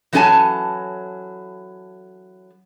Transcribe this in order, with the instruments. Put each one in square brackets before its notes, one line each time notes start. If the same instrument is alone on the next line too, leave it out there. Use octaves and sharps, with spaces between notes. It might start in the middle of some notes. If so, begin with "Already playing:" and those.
[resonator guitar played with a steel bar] E3 F#3 C#4 A4 G#5 A5